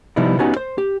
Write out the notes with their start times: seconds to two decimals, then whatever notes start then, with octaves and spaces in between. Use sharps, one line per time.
0.16 C3 F3 G3 B3 D#4 E4
0.39 B3 C#4 D#4 F#4 G4 G#5
0.57 C5
0.78 G4